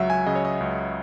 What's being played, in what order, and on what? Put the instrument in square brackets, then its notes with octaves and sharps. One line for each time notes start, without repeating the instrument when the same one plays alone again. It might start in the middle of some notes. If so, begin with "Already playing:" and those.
Already playing: [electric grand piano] C#2 F#3 E5 F#5
G#5
C#3 D#5
C#5
D#5
C#2